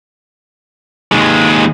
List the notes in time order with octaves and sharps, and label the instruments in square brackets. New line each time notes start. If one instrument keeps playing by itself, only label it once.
[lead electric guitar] D#2 G#3